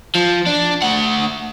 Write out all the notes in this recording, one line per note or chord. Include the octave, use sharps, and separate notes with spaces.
F3
D4
A3 F#5